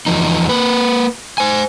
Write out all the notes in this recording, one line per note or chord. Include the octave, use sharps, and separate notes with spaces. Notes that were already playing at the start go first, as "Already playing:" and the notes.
E2 F3 D#4
A#3 B4
C5 G#5